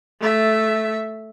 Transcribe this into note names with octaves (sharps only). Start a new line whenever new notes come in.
A3 E5